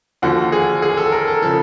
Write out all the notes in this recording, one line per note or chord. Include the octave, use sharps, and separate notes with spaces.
D#2 D3 F3 F#4
G#4
G#4
A4
A#4
A4
C#3 F3 A4